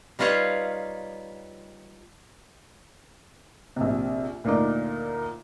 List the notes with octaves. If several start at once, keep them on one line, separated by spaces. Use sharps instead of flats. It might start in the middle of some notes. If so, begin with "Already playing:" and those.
G3 D#4 F4 B4 C#5 F5
A#1 C3
D2 A#2 D4 D#4 D6